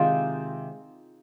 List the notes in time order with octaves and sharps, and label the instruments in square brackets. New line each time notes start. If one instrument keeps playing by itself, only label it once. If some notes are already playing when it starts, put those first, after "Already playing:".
Already playing: [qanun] C3 D#3 G#3 D#4 F4